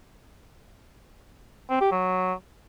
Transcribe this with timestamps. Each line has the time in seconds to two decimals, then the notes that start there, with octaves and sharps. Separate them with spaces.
1.70 C4
1.81 G4
1.92 F#3